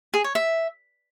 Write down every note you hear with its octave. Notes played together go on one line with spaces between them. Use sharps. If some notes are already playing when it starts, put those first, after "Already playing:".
G#4
C#5
E5